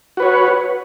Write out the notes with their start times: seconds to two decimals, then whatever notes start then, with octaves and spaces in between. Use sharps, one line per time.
0.17 F#4
0.20 B4
0.22 C#5